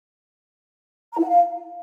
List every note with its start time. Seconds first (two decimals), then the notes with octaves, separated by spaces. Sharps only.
1.13 A#5
1.18 E4
1.24 F#5
1.29 F5